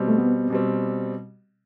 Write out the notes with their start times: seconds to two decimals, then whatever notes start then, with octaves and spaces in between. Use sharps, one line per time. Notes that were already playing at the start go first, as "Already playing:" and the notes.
Already playing: B2 G3 C4
0.08 A3
0.18 B3
0.50 B2 G3 C4